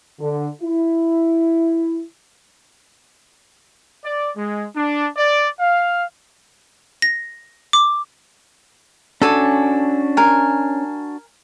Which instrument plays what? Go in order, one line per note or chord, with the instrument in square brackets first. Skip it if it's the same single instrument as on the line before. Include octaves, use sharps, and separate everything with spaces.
[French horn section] D3
E4
[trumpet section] D5
G#3
D4
D5
F5
[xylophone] A#6
D6
[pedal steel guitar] C#4 A5 D6 [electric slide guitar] D4 F#4 [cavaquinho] A4 G#5
[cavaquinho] A#4 G#5